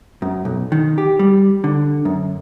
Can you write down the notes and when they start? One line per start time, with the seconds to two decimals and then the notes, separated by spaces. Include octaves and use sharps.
0.22 F#2
0.45 B1
0.72 D#3
0.98 G4
1.19 G3
1.64 D3
2.05 F#2